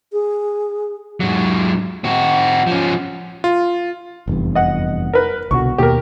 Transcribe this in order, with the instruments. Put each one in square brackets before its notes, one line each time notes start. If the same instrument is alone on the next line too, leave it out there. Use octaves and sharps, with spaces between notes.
[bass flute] G#4
[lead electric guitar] G#2 F#3
C4 F#4
F3 C#4
[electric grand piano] F4
[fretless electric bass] F1 E2 G2
[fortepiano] D#5 F#5
A#4 B4
[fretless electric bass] C2 B2 D3 [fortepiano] F#4 C#6
[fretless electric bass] D#2 B2 A#3 [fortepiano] G4 A#4